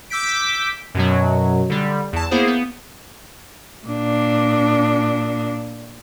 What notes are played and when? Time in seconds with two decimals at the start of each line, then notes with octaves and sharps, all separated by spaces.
0.10 D6 E6 G6 B6 D7
0.95 F#2 B2 F#3
1.69 D3 G3
2.13 E2 A5
2.31 A#3 B3 E4 G#4 C5
2.47 B3
3.87 A#2 D4